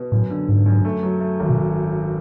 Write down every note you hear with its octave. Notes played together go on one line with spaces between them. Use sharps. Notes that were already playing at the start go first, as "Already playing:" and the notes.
Already playing: B2
F#2 A2
D3
G#2 D3
F#2
A3
F#3
A3
G#1
B2